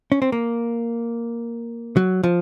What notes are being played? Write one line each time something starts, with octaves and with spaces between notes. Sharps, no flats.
C#4
C4
A#3
F#3
F3